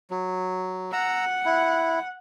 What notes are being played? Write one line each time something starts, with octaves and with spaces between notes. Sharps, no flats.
F#3
F#5 A#5 E6
E4